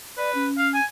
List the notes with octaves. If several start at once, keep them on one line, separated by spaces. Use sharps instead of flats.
B4 D5
C#4
F5
G#5